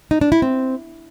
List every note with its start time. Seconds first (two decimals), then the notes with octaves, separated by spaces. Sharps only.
0.11 D#4
0.21 D4
0.32 E4
0.42 C4